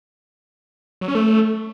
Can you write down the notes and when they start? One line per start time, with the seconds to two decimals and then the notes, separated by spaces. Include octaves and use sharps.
1.01 F#3
1.08 C#4
1.15 A3